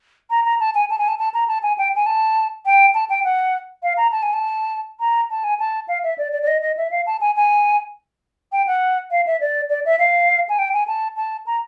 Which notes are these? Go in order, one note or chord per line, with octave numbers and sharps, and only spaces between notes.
A#5
A#5
A5
G#5
A5
G#5
A5
A5
A#5
A5
G#5
G5
G#5
A5
G5
A5
G5
F#5
F5
A#5
A5
G#5
A5
A#5
A5
G#5
A5
F5
E5
D5
D5
D5
D#5
D#5
E5
F5
A5
G#5
G#5
G5
F#5
F5
E5
D5
D5
E5
F5
G#5
G5
G#5
A5
A5
A#5